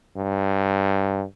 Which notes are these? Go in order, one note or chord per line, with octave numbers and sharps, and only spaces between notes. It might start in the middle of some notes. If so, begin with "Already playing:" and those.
G2